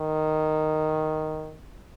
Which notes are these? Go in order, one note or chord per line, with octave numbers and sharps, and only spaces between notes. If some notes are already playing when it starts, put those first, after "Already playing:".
Already playing: D#3